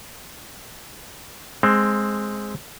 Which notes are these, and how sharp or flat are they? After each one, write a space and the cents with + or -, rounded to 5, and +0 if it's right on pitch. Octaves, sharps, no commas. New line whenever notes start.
G#3 +0 C4 +5 A5 +0